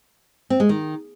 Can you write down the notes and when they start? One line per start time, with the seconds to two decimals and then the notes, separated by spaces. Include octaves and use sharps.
0.50 C4
0.60 G#3
0.69 D#3